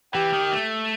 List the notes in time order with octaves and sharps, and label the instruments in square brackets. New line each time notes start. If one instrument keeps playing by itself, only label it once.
[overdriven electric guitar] E3 [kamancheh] G4
[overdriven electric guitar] D#3
A3